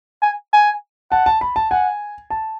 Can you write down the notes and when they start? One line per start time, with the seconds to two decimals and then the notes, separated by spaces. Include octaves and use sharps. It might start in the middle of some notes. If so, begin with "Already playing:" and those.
0.22 G#5
0.53 G#5
1.11 F#5 A5
1.26 A5
1.41 B5
1.56 A5
1.71 F#5 G#5
2.30 A5